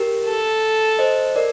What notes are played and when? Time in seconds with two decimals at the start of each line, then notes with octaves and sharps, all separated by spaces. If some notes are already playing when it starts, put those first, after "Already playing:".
Already playing: G4 A#4
0.26 A4
0.99 C5 D#5
1.36 A#4 D5